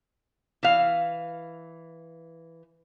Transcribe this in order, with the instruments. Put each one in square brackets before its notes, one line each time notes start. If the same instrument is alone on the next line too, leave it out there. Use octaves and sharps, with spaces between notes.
[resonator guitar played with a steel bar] E3 F5